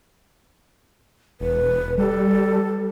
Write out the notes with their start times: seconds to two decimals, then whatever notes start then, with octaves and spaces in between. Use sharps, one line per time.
1.40 E1 B4
1.98 G3 A4